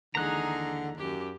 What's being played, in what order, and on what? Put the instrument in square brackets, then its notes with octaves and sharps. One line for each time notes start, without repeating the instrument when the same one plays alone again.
[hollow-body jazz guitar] D#2 E3 G#3 [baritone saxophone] D3 [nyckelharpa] D#4 G#4 [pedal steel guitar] A#5 F#6
[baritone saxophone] F#2 [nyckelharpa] G4